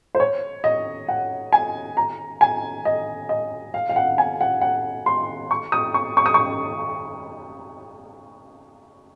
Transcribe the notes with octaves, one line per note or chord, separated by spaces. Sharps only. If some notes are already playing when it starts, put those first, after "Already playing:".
C5
C#5
D#5
F#5
G#5
A#5
G#5
D#5
D#5
F5
F5
F#5
G#5
F#5
F#5
C6
C#6
D#6
C#6
C#6
D#6
C#6